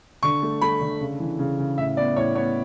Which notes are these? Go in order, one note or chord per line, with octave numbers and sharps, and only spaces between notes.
D3 C#6
A3
A3 B5
D3
C#3
E3
C#3
C#3
A2 E5
B3 D5
A2 C#5
B3 C#5